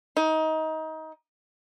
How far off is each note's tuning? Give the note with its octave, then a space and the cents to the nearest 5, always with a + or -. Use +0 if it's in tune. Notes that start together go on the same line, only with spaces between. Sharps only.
D#4 +25